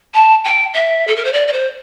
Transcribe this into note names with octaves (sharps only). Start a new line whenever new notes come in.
A5
G5
E5
A4
A#4
C5
D5
D5
C5